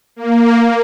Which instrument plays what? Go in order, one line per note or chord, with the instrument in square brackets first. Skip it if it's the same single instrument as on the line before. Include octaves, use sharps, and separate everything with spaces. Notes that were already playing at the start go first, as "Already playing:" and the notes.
[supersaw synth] A#3